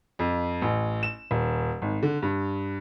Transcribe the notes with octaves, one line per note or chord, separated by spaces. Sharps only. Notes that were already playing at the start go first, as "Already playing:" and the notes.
F2
A1
E7
D#1
G#1
D3
G2